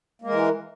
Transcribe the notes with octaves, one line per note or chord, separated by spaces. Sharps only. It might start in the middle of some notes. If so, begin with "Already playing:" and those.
E3 G#3 A#3 A#4